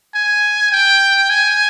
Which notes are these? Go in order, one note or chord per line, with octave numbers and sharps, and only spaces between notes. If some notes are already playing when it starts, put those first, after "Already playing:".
G#5
G5
G#5